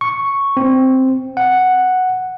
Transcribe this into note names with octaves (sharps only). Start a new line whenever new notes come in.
C#6
C4
F#5